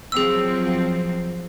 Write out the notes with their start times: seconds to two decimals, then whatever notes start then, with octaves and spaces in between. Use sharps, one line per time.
0.12 F3 F#3 C4 G#4 E6